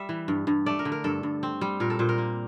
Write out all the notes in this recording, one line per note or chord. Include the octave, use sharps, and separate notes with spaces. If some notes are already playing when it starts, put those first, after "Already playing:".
Already playing: G3 E5
E3
G2
G2
A3 D5
A#4
D3
A#4
G2 A4
G2
C4
G3
A#2 A#4
A4
A#2 C5
A#4
A#3